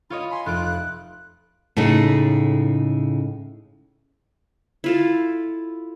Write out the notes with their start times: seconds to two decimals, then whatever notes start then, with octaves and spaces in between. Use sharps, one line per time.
0.10 F4 C#5 D#5 B5
0.31 G#5 B5 C6
0.46 F1 F4 F#6 D7
1.77 A2 C#3 G#3 A3 D#4
4.84 E4 F4 A4